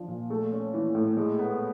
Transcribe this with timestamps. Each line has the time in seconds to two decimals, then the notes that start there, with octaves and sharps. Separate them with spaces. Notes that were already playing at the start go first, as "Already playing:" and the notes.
Already playing: F3 D4
0.08 A#2
0.30 A3
0.52 C#4
0.74 E3
0.95 A2
1.17 G#3
1.39 B3